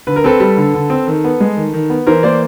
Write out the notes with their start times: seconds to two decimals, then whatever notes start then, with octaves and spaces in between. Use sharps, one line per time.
0.07 D3 B4
0.16 A#4
0.24 C4 A4 B4
0.40 G3
0.57 D3
0.74 D3
0.90 C4
1.07 D#3
1.24 B3
1.40 G#3
1.56 D#3
1.73 D#3
1.90 B3
2.07 E3 A#4 C5
2.23 A#3 C5 D5